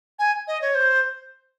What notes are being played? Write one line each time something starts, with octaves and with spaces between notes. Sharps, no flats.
G#5
D#5
C#5
C5